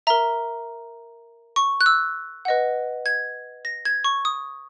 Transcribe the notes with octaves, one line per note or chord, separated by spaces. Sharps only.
A#4 E5 A#5
C#6
F#6
E6
B4 D#5 F#5
G#6
A#6
G#6
C#6
D#6